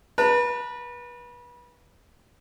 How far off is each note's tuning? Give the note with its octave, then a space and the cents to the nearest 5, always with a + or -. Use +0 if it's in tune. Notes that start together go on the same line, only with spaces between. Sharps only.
B4 -30 A5 +40